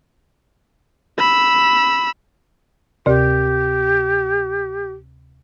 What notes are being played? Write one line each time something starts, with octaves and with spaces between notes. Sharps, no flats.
B5 E6
D2 C3 G4